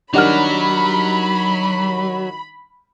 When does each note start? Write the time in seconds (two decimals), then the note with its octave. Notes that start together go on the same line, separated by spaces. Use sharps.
0.14 D#3 F#3 G3 D4 D#4 F#5 B5 F6